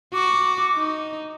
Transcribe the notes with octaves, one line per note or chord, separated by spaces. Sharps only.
F#4 D6
D#4